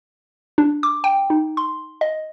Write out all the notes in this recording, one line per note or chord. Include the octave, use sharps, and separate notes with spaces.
D4
D6
G5
D#4
C6
D#5